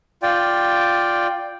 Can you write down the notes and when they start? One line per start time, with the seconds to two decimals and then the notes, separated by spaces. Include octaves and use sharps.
0.23 F4 D5 G5